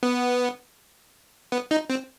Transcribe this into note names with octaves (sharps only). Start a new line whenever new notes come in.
B3
B3
D#4
C4